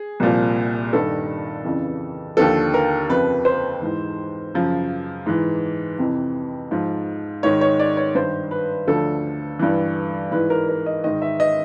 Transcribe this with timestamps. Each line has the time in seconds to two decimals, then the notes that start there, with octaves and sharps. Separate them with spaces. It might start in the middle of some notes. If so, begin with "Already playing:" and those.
Already playing: G#4
0.20 C2 A#2 F3
0.93 G2 D#3 A4
1.65 F2 C#3 E3
2.37 D#2 D3 F3 A4
2.74 A#4
3.09 F2 C#3 F3 B4
3.45 C5
3.82 G#2 E3
4.55 F#2 C#3 F3
5.26 G#2 E3
5.98 F2 C3 E3
6.71 G#2 F3
7.43 G#2 D#3 C#5
7.61 C#5
7.79 D5
7.97 C#5
8.15 G2 D#3 C5
8.51 B4
8.87 D2 D3 F3 A4
9.59 G2 E3
10.31 G#2 E3 B4
10.50 A#4
10.69 A#4
10.86 D#5
11.04 G#2 D#3 D#5
11.22 E5
11.40 D#5